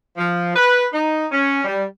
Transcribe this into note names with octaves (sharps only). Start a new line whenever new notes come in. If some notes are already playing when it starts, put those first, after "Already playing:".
F3
B4
D#4
C#4
G3